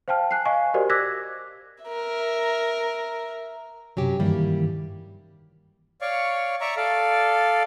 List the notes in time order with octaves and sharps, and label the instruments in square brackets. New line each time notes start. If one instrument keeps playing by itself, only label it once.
[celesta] C5 F5 G5 A5 F6
G#5 F#6 C7
D#5 F5 G#5 C#6
F#4 G4 A#4 C5 D5 D#5
D6 E6 F#6 G#6 A#6 B6
[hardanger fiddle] A#4 E5
[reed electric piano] F#2 C3 [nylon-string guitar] F#3 C#4 G4
[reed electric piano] G2 D#3 E3 [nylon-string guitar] G3 A#3 E4
[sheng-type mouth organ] C#5 D5 F5 C#6
D5 E5 A#5 C#6
A4 D5 F5